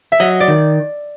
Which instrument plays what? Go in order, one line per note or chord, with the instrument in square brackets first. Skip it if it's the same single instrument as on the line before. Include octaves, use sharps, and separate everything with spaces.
[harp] E5
[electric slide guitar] F#3 [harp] D#5
[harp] D5
[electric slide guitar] D#3